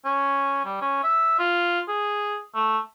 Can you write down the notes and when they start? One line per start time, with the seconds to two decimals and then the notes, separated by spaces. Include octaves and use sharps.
0.05 C#4
0.65 G3
0.82 C#4
1.04 E5
1.39 F4
1.88 G#4
2.55 A3